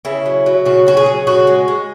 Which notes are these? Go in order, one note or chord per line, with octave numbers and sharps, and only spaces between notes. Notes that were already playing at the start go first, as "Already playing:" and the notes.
C#3 E4
F#3
F#3
C#3 F#4
F#3 F#4
G#4
F#3
C#3 F#4
G#3
G#3